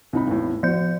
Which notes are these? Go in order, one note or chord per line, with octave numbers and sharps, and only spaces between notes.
C2 D#4 B5
G#1 E2 A2
F3 F#4 C5 G6